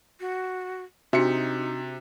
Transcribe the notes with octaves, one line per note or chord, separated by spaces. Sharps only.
F#4
C3 D4 D#4 F#4 E5 C#7